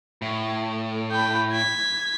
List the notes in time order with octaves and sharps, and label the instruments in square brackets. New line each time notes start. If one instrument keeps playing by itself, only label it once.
[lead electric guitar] A2
[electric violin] G5 B5
G#6 B6